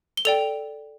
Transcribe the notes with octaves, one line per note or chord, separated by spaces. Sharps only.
G7
A4 D5 G5 F7